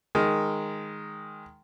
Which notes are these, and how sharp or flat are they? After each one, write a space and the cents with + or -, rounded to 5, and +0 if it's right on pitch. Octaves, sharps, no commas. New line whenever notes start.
D#3 +0 G#3 +0 A#4 +0